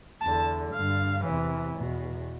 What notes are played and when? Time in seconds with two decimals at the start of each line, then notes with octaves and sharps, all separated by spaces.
0.21 E2 D3 A5
0.73 G2 D3 F5
1.24 E2 C3 E3
1.76 E2 B2